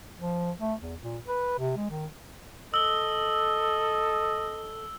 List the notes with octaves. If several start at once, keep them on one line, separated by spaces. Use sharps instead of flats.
F3
A3
E2
A#2
B4
C3
G#3
D#3
A4 D#5 E6 G7